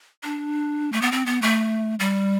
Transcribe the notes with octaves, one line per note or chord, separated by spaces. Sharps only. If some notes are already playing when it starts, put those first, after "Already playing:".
D4
A3
B3
C4
B3
A3
G3